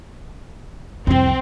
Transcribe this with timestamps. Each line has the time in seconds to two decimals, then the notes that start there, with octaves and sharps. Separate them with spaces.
1.07 C2 F2 C4